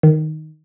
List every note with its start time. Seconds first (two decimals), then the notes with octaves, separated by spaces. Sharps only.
0.03 D#3